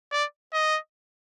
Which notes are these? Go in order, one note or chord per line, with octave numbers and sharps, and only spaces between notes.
D5
D#5